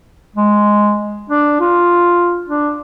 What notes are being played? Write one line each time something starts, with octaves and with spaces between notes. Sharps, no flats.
G#3
D4
F4
D4